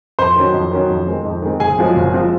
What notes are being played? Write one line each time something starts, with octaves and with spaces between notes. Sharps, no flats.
F2 C5 C6
D#3 F#3 C#4
F2
D#3 F#3 C#4
F2
D#3 G#3 C4
F2
D#3 G#3 C4
F#1 G#4 G#5
F#2 F3 G#3 C4
F#1
F3 G#3 C4